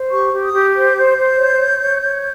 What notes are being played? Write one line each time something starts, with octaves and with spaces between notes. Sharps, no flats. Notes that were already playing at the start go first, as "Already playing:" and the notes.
Already playing: C5
G4 C#6
G4
D#6
G4
C5 G6
C5
C5
C#5
C#5
C#5
C#5